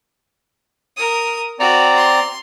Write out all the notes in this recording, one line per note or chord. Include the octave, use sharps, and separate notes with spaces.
A#4 D#6
C4 F#4 D5 A#5
C6